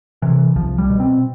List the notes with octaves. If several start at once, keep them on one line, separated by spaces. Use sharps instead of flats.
C3 E3
C2 F3
G3
B2
C4